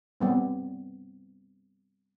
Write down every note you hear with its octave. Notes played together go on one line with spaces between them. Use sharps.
G3 B3 C4